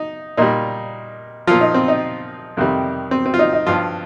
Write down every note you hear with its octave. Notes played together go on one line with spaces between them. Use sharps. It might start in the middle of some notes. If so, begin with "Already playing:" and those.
Already playing: D#4
A#2 G3 D#4
A#2 F3 F4
D#4
C4
D#4
F2 C3 D#3 G3
C4
C4
F4
D#4
D#4
G2 F3 F4